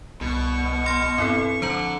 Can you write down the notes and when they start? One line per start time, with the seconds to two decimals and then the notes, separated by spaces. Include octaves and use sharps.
0.21 C2 B2 C#6
0.86 C6 F6 A#6
1.18 G2 C4 E4 A4
1.62 D3 F3 C5 A#5 F#7